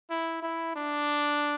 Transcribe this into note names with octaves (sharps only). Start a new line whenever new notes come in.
E4
E4
D4